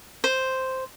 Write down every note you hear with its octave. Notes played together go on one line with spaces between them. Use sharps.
C5